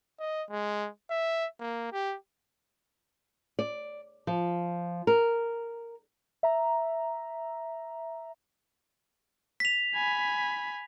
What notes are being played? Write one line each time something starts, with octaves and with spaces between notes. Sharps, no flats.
D#5
G#3
E5
A#3
G4
D5
F3
A#4
E5 A#5
B6 F7
G#5 B5